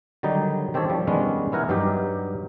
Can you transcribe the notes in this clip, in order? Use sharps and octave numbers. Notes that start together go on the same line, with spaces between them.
D3 D#3 F#3 G3 D#4
D#3 C4 G4 A4 C#5
F3 G3
D#3 G3 G#3 B3 C#4 D4
B3 E4 A#4 F#5 G#5
G2 F#3 D#4 G4